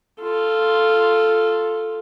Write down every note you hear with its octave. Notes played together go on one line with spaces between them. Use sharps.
F4 A4